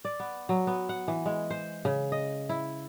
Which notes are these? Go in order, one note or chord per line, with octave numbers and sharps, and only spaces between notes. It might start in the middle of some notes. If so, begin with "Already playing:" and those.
D5
B3
F#3
B3
F#5
E3
G#3
C5
C#3
D#5
E4